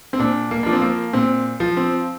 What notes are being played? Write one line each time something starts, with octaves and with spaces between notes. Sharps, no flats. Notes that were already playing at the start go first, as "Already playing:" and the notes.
C4
A#2 D4
A#3
F3 D4
C4
A#3
A#2 C4
F3
C4